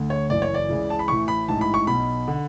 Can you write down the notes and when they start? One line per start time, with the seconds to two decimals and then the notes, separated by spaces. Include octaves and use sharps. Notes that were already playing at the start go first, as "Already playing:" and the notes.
Already playing: D2 D3
0.10 C#5
0.30 F#1 F#2 E3 D5
0.42 C#5
0.54 D5
0.69 C#2 C#3 E3
0.90 A5
0.99 B5
1.08 A1 A2 E3 C#6
1.28 B5
1.48 A1 G#2 E3 A5
1.61 B5
1.74 C#6
1.87 B1 B2 B5
2.28 D3